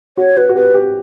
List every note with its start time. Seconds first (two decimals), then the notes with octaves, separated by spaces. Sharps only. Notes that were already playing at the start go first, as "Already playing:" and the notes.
0.17 F#4 C#5
0.37 F#4 B4
0.49 F#4
0.55 G4 B4
0.74 G4